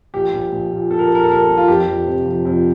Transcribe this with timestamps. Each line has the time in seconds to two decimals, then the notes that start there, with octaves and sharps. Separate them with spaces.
0.14 A#1 G4
0.33 A#1
0.52 A#1
0.71 A#2
0.91 A#2 A4
0.99 A#4
1.07 A#2 A4
1.15 A#4
1.24 A4
1.30 A#1 A#4
1.39 A4
1.48 A#1
1.57 F4
1.68 F2 G4
1.87 F2
2.07 C3
2.26 F2
2.45 F2